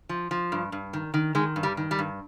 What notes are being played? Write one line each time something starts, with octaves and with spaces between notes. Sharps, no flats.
F3
F3
G2
G2
D#3
D#3
D#3 G#3
G2
G3
D#3
G3
G2